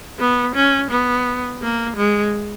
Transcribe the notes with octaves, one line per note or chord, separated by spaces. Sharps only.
B3
C#4
B3
A#3
G#3